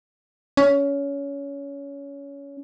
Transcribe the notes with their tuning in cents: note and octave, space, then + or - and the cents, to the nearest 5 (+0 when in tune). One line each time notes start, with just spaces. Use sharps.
C#4 +20